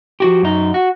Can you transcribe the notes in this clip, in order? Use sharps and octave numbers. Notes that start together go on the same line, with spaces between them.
F3 F#4 G4
F#2 D#4
F#4